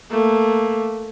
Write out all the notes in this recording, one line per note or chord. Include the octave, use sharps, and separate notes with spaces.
A3 A#3